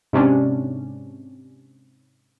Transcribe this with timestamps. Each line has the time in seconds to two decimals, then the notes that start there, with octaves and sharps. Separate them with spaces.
0.13 G#2 C3 C#4 D4